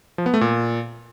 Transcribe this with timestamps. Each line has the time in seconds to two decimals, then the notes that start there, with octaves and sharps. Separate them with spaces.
0.18 F3
0.26 B3
0.34 A3
0.41 A#2